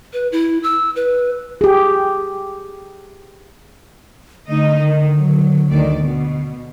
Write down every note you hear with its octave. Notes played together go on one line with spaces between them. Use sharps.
B4
E4
E6
B4
G4 G#4
D3 A3 D#4 D#5
D#3
F#3
D2 D#3 D5
B2